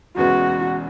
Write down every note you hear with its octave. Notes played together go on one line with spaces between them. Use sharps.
E1 E2 C#3 G#3 B3 F#4